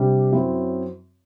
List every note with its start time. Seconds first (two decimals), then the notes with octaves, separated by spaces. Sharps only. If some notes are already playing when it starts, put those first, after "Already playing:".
Already playing: C3 G3 D4
0.32 F#2 F#3 C4 E4